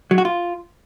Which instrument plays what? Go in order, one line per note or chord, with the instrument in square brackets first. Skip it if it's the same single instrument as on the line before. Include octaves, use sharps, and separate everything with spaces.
[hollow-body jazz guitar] F#3
F#4
F4